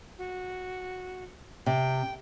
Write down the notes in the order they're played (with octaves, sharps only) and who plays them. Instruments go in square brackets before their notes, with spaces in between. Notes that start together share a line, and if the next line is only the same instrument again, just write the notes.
[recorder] F#4
[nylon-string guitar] C3 [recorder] G5